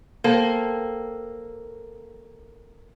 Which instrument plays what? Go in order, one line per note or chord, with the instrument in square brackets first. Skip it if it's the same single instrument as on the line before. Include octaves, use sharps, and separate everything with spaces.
[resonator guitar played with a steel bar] A#3 [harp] A4 C5 G5